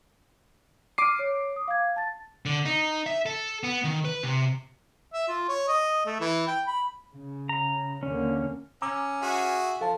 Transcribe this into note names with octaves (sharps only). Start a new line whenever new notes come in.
D6 F6 C7 D7 D#7
C#5
D#6
F5 G#6
A5 A6
D3
D#4
E5
A4
B3
D#3
B4
C3
E5
F4
C#5
D#5
A3
E3
G5
B5
C#3
A#5
D#2 D3 A#3 C#4
C#4 A#5 D6 E6
F#4 G#4 E5
F3 A4 F5 A5